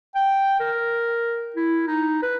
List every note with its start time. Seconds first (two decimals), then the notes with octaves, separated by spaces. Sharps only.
0.15 G5
0.60 A#4
1.56 E4
1.87 D#4
2.22 B4